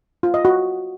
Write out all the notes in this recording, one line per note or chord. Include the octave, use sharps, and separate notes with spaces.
F4
D#5
F#4